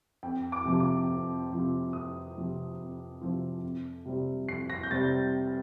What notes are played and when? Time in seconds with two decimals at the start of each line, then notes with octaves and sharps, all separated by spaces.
0.23 F2 G5
0.52 D6
0.65 C3 F3 C4 F4
0.80 D6
1.09 F2
1.51 C3 F3 C4 F4
1.93 F2 D#6
2.35 C3 F3 C4 F4
2.79 F2
3.21 C3 F3 C4 F4
3.63 F2
4.06 C3 G3 C4
4.49 F2 C7
4.70 A#6
4.83 G6
4.91 C3 G3 C4 A6